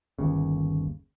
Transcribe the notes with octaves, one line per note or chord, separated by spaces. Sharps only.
G1 D#2 C#3